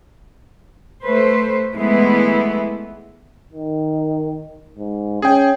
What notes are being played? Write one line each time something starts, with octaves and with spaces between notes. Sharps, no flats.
A3 B4 C5
E3 G#3 A3 B3 E4
D#3
G#2
C#4 G#4 G5